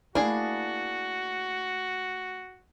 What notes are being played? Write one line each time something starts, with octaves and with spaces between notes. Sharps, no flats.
A3 A#3 D4 E4 F#4 G#4